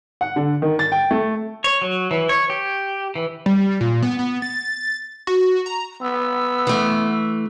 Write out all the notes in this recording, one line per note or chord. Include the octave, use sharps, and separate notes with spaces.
F#5
D3
D#3
A6
G5
A3
C#5
F#3
E3
C#5
G4
E3
G3
A#2
B3
B3
A6
F#4
A#5
B3 E6
E3 A3